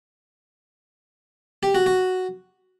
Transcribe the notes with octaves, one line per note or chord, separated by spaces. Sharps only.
G4
F#4
F#4